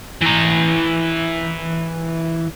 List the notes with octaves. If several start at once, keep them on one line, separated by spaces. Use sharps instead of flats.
E3 A#5